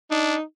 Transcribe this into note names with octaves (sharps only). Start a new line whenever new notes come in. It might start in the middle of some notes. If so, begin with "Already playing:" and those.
D4 D#4